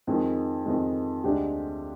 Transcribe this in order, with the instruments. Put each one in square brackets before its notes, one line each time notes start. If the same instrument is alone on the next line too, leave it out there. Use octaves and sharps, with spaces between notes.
[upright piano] F2 D#3 G#3
F2 D#3 G#3
D2 D3 G#3 D4 G4